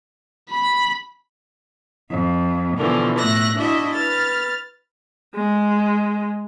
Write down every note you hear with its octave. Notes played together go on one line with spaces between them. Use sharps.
B5
F2
B2 D3 E3 F3
A2 A3 E5 F#6 A#6
D4 E4 F#4 D#5 E5
B4 F6 A6
G#3